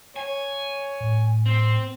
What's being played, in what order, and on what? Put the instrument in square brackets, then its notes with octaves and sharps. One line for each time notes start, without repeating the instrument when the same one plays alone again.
[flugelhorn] C#5 [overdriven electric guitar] G#5
[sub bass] A2
[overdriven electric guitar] C4